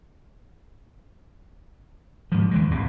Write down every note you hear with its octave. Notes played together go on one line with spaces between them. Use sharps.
G#2 F3
D#2 E3 G#3
D1 C2 G2 A#2